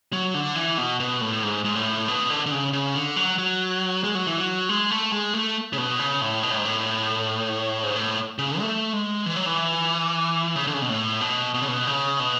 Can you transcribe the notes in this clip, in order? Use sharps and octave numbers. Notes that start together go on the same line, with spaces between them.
F#3
D3
E3
B2
B2
A2
G#2
G#2
A2
B2
D3
D3
C#3
C#3
D3
F#3
F#3
G#3
F#3
E3
F#3
G#3
A3
G#3
A3
C#3
B2
C#3
A2
B2
A2
G#2
A2
G#2
A2
C#3
A3
G#3
E3
F#3
E3
C#3
D3
C#3
B2
A2
B2
B2
C#3
B2
C#3
B2